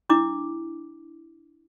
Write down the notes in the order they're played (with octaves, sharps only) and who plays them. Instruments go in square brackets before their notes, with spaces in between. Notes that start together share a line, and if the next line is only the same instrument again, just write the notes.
[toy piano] D4 E4 D6